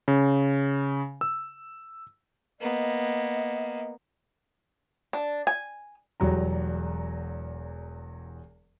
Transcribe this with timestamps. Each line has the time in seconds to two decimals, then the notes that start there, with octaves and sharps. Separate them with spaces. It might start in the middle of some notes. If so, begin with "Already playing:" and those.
0.08 C#3
1.21 E6
2.60 A#3 B3 D#5
5.13 D4
5.47 G#5
6.20 E1 E2 F#3 G3 A#5